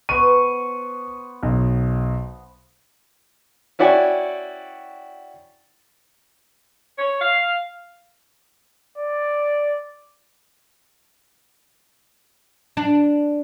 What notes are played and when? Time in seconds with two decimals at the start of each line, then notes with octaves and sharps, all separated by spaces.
0.09 B3 C5 C#6 D#7
1.43 B1
3.79 C#4 E4 F#4 D5 G5 G#5
6.99 C#5
7.22 F5
8.98 D5
12.77 D4